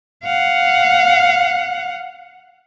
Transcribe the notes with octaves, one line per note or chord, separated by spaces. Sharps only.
F5 F#5